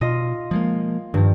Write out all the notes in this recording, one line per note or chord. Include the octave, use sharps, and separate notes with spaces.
B2 F4 D#5
F3 G#3 A#3
G2 D#3 F3